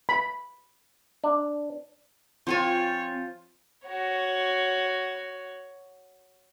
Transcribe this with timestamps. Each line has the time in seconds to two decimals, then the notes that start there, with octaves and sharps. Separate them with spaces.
0.09 B5
1.24 D4
2.47 F3 C4 F4 C5 C#5 G5 G#5
3.86 F#4 C#5